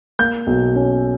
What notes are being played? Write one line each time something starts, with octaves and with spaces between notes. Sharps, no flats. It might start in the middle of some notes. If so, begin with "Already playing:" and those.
A#3 G6
B1
C#4